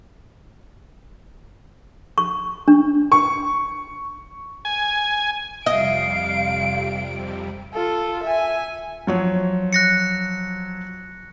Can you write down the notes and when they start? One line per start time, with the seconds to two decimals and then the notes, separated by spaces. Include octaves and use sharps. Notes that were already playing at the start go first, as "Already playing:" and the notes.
2.18 C#6
2.68 D4
3.12 C#6
4.65 G#5
5.66 F2 C3 G3 D#5 F5 D7
7.74 F4 A4
8.23 E5 G#5
9.07 F3 F#3 C#5
9.73 F#6 A#6 C#7